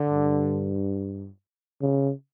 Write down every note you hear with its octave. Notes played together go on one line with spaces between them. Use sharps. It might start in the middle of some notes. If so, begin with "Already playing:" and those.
Already playing: D3
G2
C#3